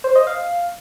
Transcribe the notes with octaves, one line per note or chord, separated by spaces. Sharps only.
C5
D#5
F5